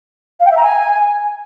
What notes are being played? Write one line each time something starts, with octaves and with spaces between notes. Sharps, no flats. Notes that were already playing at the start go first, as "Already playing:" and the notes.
F5
G5
E5
A#5
G#5